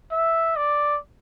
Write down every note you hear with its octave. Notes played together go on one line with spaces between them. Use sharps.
E5
D5